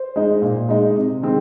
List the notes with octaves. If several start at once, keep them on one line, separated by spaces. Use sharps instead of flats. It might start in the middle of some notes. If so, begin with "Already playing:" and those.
Already playing: C5
G#3 D#4
A#2
G#3 D#4
C3
D#3 G#3 C4